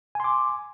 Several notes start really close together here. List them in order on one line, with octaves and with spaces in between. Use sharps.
G#5 C6 D6